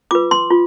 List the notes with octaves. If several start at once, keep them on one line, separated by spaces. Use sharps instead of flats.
F4 B4 D6
C6
F4